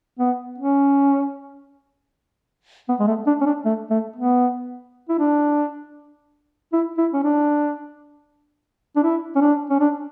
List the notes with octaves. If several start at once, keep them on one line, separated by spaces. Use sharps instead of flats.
B3
C#4
B3
G#3
A3
D4
C#4
D4
A3
A3
B3
E4
D4
E4
E4
C#4
D4
D4
E4
C#4
D4
C#4
D4